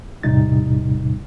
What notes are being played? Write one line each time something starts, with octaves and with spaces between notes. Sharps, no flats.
E2 A2 C3 G3 D#4 A6